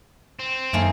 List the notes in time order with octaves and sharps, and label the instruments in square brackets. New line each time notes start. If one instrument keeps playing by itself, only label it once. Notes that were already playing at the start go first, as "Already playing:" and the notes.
[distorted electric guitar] C4
[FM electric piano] F#2 G#5 [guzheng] D#3 A3 A#3